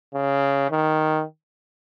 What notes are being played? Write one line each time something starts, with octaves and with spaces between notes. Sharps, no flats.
C#3
D#3